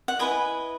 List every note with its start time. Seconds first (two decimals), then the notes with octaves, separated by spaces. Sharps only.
0.08 F#5
0.19 E4 B4 D#5 G#5